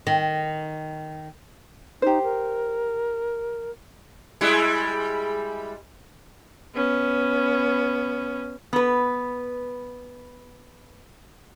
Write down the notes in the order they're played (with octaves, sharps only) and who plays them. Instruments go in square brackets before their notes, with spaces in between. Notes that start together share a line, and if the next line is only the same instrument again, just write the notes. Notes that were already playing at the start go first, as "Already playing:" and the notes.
[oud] D#3
[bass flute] D#4 [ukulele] G4 C5
[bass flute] A#4
[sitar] G3 G#3 E4
[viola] B3 C#4
[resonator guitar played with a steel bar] B3 B4